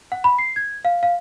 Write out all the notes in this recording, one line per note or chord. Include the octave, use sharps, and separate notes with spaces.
F#5
B5
C7
G#6
F5
F5